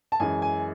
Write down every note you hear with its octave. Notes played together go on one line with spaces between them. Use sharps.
A5
F#2 E3 G#3 G#5
G#5